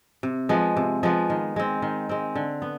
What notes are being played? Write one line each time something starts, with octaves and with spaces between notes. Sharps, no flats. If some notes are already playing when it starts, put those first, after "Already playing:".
C3
F3 G#3 B3
C3
F3 G#3 B3
D#3
G#3 C4
D#3
G#3 C4
D3
B3